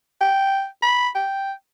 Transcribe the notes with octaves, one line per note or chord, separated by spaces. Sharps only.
G5
B5
G5